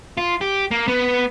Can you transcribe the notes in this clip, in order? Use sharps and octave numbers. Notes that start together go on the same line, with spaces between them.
F4
G4
A#3
B3